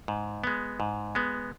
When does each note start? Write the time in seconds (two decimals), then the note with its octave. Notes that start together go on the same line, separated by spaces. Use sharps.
0.08 G#2
0.44 G#3 B3
0.80 G#2
1.15 G#3 B3